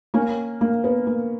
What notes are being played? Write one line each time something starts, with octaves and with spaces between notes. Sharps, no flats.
A#3 C#4
A#3
B3
A#3